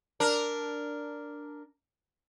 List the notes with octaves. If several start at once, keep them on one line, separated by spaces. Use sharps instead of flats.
D4 A#4